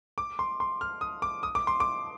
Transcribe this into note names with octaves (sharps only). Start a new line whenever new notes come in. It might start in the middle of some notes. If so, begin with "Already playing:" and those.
D6
C6
C6
F6
D#6
D6
D#6
D6
C6
D6